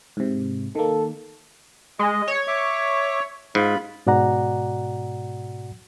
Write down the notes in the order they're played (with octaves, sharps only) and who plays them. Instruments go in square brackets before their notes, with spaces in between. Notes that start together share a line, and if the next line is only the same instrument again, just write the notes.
[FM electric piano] G#2 C3
[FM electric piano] D#3 A#3 [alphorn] A4
[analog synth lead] G#3 [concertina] D#5
[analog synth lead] C#5
[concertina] E5 D6
[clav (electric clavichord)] G#2 [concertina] F4 B5
[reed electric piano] G#2 B2 F#4 D5 F#5 A#5